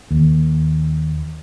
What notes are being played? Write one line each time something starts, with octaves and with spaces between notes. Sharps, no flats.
D#2